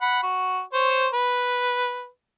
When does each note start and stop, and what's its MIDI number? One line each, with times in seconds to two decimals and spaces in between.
0.01 0.20 78
0.01 0.20 83
0.23 0.61 66
0.73 1.07 72
0.73 1.07 73
1.14 2.08 71